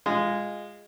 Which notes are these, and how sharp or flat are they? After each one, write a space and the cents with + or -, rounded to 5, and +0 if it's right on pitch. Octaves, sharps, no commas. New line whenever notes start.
G#3 -15 F4 +0